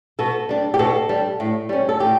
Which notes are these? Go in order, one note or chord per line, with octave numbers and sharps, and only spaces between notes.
B2 A4
G3 D4
G4
B2 A4
G3 D4
A2
G3 C#4
A4
A2 G4